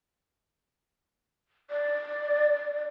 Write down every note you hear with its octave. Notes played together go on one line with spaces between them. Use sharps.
D5